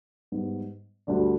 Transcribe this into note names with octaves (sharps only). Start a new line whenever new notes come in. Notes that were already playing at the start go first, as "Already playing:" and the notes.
G#2 G3 B3
D2 D3 G3 D4